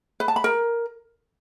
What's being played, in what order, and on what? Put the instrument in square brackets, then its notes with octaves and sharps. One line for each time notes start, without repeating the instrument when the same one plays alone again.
[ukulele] B4
A5
B5
A#4